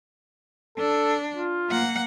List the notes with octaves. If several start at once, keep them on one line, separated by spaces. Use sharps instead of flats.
D4 A4
F4
A#3 F#5